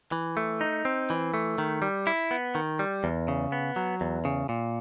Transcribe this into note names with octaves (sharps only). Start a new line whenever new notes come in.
E3
A3
D#4
C4
E3
A3
D#3
G3
E4
B3
D#3
G3
E2
C#3
B3
F#3
E2
C#3
A#2